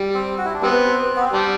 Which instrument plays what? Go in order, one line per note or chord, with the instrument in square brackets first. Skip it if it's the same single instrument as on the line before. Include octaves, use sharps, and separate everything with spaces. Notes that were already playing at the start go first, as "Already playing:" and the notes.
Already playing: [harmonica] G3
[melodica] C4
F#4
E4
D4
[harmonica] G3 B3 [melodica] C4
[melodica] B3
C4
[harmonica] G3 [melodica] D4